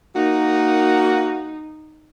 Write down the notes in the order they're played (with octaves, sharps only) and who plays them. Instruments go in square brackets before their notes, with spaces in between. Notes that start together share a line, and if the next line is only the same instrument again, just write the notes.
[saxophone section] A#3 F#4 [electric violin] D#4